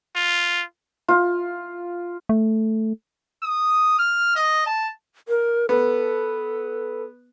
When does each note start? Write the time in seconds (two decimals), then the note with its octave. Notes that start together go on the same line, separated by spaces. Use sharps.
0.16 F4
1.08 F4
2.29 A3
3.43 D#6
3.99 F6
4.36 D#5
4.66 A5
5.28 A#4
5.69 B3 A4